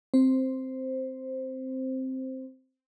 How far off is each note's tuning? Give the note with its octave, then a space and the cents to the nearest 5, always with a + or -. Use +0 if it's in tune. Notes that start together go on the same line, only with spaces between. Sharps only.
C4 +0 C5 +0